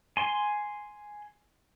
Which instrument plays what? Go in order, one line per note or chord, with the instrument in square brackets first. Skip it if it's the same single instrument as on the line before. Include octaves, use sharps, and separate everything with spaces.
[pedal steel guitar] G#5 C6